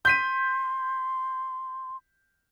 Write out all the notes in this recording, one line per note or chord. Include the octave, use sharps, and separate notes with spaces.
C6 G6 B6 D#7